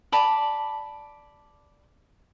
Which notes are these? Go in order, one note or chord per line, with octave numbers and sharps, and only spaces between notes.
D5 A5 B5